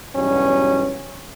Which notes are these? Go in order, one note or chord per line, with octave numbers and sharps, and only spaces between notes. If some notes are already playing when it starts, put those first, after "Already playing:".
E2 G2 B2 F#3 C#4